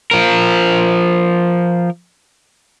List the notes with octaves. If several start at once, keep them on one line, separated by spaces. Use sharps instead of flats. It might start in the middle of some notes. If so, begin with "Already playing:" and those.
F3 A#4